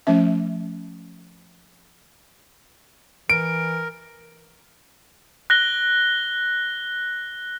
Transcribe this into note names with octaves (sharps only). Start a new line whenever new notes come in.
F3 A3 C#4 E5
E3 A#4 D7
F#6 A#6 G7